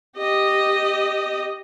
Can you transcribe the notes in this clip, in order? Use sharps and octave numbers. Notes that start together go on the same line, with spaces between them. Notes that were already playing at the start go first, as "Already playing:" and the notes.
G4 D#5